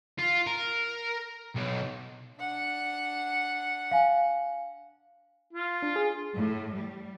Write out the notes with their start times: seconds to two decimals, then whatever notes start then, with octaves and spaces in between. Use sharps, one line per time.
0.19 F4
0.47 A#4
1.56 B1
2.39 D4 F#5
3.91 F5 G#5
5.53 F4
5.82 D4
5.96 G#4
6.36 A2
6.75 G3